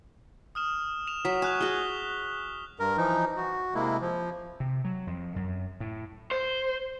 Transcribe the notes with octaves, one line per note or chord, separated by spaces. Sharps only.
D#6 F6 E7
E7 F7
F#3 B6
G#5 C#6 F#6 F7
F#4 G#4 G7
G2 A#4
E3 F3 D#4
F#4
C3 G#3 A#3 E4
F3
C3
F#3
F2
F#2
A2
C5